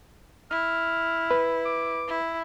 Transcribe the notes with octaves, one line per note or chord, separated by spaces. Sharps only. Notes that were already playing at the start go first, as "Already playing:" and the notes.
E4 F6
B4
D6
E4